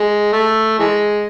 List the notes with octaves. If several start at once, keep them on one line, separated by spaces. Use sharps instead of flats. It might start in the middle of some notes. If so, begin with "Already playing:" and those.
Already playing: G#3
A3
E3 G#3